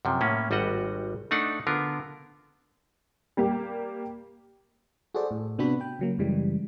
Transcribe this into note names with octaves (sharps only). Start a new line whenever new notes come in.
F#2 C3 F3
A2 A#3 C#4
G#1 G3 F#4 D#5 F#5
A3 D4 D#4 F#5
D3 B3 F4 A#4
G3 A#3 G4
F#4 G#4 A4 C5 D5
A2
C3 B3 D4 F#4 B4 B5
G5
C#3 F#3 A#3
F#2 C#3 E3 G3 G#3